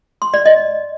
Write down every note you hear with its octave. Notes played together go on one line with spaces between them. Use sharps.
C6
D5
D#5